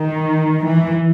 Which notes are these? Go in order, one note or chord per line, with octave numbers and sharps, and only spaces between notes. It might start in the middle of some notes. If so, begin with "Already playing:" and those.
Already playing: D#3
E3